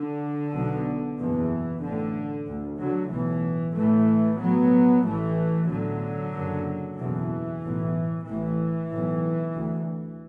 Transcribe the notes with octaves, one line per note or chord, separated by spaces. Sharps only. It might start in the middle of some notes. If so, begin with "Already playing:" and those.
Already playing: D3
B1 B2
F#1 E2 B2 E3
A1 A2 D3
D2
D3 F#3
B1 A2 E3
A1 A2 E3 A3
B1 A2 F#3 B3
A1 A2 E3 A3
B1 A2 D3 F#3
F#1 F#2
F#1 E2 B2 E3
B1 A2
A1 A2 E3
B1 A2
D2